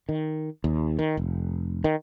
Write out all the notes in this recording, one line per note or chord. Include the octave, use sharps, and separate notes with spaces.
D#3
D#2
D#3
F1
D#3